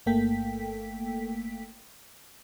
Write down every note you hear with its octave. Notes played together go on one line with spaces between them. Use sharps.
G1 A3 A#3 A4 G5 B6